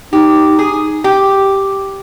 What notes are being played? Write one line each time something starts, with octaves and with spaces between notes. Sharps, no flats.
D#4 G4
G#4
G4